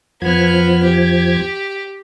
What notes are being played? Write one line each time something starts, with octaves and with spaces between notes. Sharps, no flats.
F2 F3 B3 F6 G#6
G4